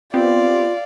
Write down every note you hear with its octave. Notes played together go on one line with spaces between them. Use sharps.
B3 C4 F4 G4 D5 F5